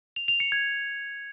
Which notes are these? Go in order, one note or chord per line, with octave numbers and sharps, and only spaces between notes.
F7
F7
C#7
G#6